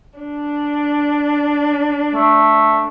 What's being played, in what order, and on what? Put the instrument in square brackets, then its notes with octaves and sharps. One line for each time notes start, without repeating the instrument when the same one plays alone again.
[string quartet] D4
[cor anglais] A3